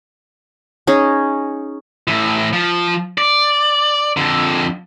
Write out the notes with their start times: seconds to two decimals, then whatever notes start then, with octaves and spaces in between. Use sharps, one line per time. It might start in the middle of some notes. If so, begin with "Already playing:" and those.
0.87 C#4 D#4 G#4
2.08 A2 E3
2.53 F3
3.18 D5
4.17 F2 D3